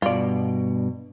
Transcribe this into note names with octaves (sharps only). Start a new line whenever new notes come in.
G2 B2 F4 D5